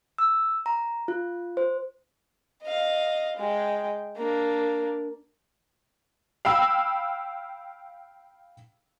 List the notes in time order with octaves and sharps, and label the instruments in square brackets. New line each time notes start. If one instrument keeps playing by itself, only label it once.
[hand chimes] E6
A#5
F4
C5
[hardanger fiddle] D#5 F5
G#3 G5
A#3 D4
[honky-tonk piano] F5 G5 B5 E6